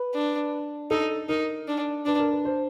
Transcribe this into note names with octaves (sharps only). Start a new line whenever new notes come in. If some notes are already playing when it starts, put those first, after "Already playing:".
Already playing: B4
D4
D#4 A4
D#4 A#4
D4
D4 B4
A#4
B4
C5